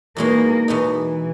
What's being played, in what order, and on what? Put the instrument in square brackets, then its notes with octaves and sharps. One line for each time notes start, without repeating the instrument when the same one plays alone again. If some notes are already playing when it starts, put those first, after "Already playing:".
[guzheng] E2 B2 G#3 D#4 [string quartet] A#3
[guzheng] E2 B2 G#3 D#4 [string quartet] E3